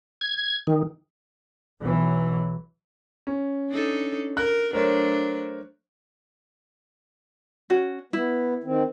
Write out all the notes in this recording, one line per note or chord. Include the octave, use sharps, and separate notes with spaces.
G#6
D#3
B1 E3 F#3
C#4
D4 D#4 A4
A#4 F#6
F#3 A3 D4 A#4 C5 C#5
C#4 F#4
B3 E4
D#3 C4